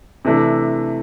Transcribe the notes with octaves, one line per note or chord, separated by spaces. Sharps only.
C3 E3 A3 D4